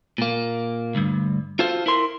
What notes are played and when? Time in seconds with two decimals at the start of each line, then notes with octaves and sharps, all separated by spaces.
0.18 A#2 A#3
0.95 D2 G2
1.59 F4 F#4 A4 C5 F5
1.86 E4 A#4 C6